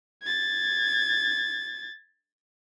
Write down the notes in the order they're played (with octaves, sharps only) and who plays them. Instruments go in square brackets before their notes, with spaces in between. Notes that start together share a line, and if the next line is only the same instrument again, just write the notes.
[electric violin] G#6 A6